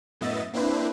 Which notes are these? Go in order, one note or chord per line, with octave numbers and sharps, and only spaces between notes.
F#2 A2 B3 D#5 E5 A6
A#3 C4 D4 E4 B4 C5